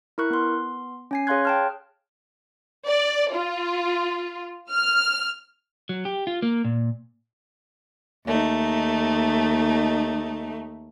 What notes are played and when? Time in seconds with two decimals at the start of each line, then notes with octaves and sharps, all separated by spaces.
0.18 E4 A#4 C#6 F#6
0.30 B3 C6
1.11 C#4 G#5 C7
1.27 G#4 C#5 F5 C6 F#6 G#6
1.45 G5 A5 F6
2.88 D5
3.34 F4
4.71 F6
5.89 F#3
6.05 G4
6.27 F4
6.42 A#3
6.64 A#2
8.25 D#2 A3 D#4